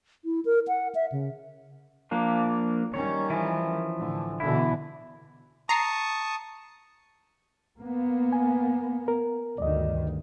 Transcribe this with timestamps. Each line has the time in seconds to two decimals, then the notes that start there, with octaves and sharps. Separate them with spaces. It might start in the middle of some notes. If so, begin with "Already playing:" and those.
0.25 E4
0.45 A#4
0.68 F#5
0.95 E5
1.12 C#3
2.11 F3 A#3 D4
2.94 D#3 G3 C#4 C#5
3.30 E3 F3
3.98 A2 D3
4.40 B2 D3 E3 E4
5.69 A5 A#5 C#6 D#6 C7
7.78 A#3 B3
8.32 G#5
9.08 A#4
9.58 D2 G2 D#3 D5 D#5